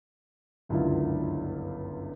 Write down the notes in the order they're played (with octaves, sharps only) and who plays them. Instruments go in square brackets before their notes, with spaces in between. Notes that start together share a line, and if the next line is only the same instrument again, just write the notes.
[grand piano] G1 C#2 F#2 D3 E4 F4